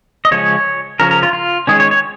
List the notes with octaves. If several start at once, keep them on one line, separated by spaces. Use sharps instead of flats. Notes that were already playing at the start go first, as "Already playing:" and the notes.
D#5
C#3 F3 G#3 C#4 C#5
C#3 F3 C#4 A#4
A#4
F4
F4
D#3 G#3 C#4 G#4
C#5
C#5